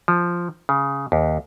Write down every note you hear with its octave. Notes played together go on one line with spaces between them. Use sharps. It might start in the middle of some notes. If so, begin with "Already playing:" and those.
F3
C#3
D#2